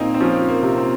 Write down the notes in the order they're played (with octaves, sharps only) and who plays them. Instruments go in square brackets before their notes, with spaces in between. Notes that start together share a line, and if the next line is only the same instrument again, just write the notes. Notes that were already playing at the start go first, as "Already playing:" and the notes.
Already playing: [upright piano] A#2 [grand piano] A#3 C4 D#4
[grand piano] C4
[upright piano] F3 [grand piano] C#4
[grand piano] A#3
[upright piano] C3
[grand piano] C4